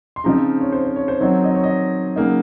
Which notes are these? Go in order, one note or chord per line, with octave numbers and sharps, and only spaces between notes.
C6
C#3 F3 C4 D#4 A#5
C#5
C5
C5
C#5
C5
D#3 F#3 C4 D#4 C#5
D#5
C#5
D#5
C#3 F#3 A#3 D#4